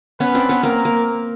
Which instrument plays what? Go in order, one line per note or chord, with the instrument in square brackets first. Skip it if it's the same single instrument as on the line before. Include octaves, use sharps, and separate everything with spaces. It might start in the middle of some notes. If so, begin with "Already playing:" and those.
[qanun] B3 C#4 [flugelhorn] B4
[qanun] C4 D4
B3 C#4
[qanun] A#3 C4 [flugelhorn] A#4
[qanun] A#3